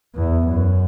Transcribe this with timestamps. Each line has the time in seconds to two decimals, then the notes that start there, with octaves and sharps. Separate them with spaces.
0.16 E2
0.47 F#2